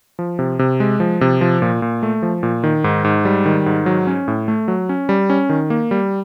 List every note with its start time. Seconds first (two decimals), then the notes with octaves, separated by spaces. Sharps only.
0.19 F3
0.39 C3
0.59 C3
0.80 G#3
1.00 F3
1.21 C3
1.41 F3
1.62 A#2
1.82 A#2
2.03 A3
2.22 F3
2.43 A#2
2.64 D#3
2.84 G#2
3.04 G#2
3.25 G3
3.46 D#3
3.66 G#2
3.86 F#3
4.07 C#4
4.28 A2
4.48 A3
4.68 F#3
4.89 C#4
5.09 G3
5.30 C#4
5.49 D#3
5.70 A#3
5.91 G3